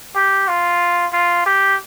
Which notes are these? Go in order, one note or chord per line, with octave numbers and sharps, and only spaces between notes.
G4
F4
F4
G4